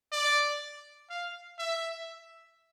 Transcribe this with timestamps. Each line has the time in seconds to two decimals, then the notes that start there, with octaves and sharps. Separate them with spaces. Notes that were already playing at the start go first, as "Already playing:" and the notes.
0.12 D5
1.10 F5
1.59 E5